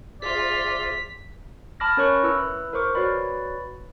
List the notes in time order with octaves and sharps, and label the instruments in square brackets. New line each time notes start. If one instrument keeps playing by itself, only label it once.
[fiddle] F4 [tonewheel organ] G#4 C5 E5 [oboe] D5 [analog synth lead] B6
[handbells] A5 B5 D6 F6 A#6
C#4 A#4 C#5 B5 C#6 F#6
E4 B4 E6 F#6
A#4 C5 C#6 D6
F#4 B4 C#5 D5 B5